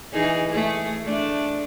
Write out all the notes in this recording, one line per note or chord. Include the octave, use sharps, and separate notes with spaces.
E3 D#4 G#4
A3 G#4
A3 D4